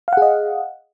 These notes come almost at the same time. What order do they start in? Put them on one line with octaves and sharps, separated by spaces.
F5 F#5 G#4 D#5